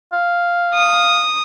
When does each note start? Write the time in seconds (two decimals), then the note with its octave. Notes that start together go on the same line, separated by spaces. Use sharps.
0.13 F5
0.74 D#6